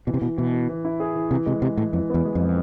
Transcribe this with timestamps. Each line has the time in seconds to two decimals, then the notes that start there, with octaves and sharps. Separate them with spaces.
0.07 B2 E3
0.14 C3
0.22 B2 E3
0.38 B2 E3
0.53 E3
0.69 E3
0.85 E4
1.00 G#4
1.15 E3
1.31 C3 E3
1.46 C3 G#3
1.62 C3 G#3
1.77 A2 E3
1.93 F2 E3
2.10 E2 B3
2.25 G#3
2.35 F2 G#3